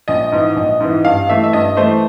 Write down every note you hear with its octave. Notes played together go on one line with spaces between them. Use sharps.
A#1 D#5
G#2 E3
A#1
G#2 E3
G2 F5
E3 A3 E5
E5
G2 D#5
E3 A3 C5